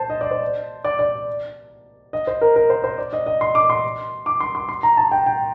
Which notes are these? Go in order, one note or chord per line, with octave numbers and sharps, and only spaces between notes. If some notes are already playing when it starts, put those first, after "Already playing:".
Already playing: C5 A5
D#5
D5
C5
D5
D5
D#5
C5
A#4
A#4
C5
C5
D5
D#5
D#5
C6
D6
C6
D6
C6
C6
C6
A#5
A5
G5
G5